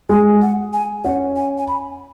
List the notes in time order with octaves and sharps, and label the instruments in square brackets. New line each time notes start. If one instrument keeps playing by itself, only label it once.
[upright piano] G#3 [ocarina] G#5
[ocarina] F#5
G#5
[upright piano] C#4 [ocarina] F#5
[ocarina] G#5
G#5
B5